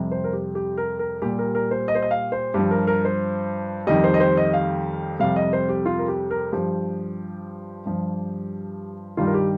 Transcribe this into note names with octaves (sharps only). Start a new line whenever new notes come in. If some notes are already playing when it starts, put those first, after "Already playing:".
Already playing: F2 C3 G3
C5
A#4
G4
G4
A#4
A#4
A#2 G3 G4
A#4
A#4
C5
D#5
C5
D#5
F5
C5
G2 F3 G4
A#4
A#4
C5
F2 D#3 G3 D#5
C5
D#5
C5
D#5
F5
F2 C3 G3 F5
D#5
C5
G4
F4
A#4
G4
A#4
G2 F3 G4
G2 F3
G2 D#3 G3 F4
A#4
G4